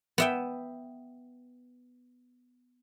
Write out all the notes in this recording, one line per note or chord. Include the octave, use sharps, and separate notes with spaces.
B3 E5 G5